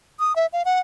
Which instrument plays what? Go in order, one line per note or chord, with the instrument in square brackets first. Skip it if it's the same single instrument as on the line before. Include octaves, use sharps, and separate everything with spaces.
[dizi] D#6
E5
F5
F#5